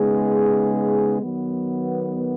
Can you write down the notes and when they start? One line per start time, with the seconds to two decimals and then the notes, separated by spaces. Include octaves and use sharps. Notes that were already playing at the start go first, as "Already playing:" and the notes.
Already playing: C#3 G#3 B3 D#4 G#4
1.21 D#3 F#3 B3